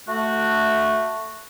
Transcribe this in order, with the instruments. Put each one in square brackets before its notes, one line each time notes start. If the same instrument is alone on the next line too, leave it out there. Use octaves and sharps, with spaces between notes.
[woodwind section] A3 F#4